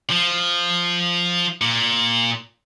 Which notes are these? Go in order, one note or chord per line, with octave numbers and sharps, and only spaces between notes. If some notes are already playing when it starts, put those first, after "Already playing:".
F3
A#2